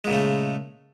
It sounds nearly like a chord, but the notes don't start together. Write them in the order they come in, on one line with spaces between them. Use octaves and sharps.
G#3 A#2 C#3 A3